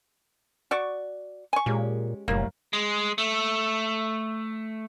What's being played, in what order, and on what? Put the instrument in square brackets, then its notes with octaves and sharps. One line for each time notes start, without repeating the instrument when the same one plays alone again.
[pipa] F#4 D5 C#6
G#5 C#6
[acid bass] A#2 [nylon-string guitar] G#3 C#4 G4
[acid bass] F1 [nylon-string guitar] F#2 A2 G3 [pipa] A#3
[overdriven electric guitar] G#3
A3